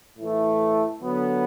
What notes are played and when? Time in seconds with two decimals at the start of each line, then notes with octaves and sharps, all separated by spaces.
0.19 A2 E3 A3 E4
1.01 D3 F#3 B3